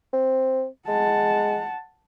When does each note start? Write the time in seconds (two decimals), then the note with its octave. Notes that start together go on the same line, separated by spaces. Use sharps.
0.13 C4
0.88 G#3 F#5 A5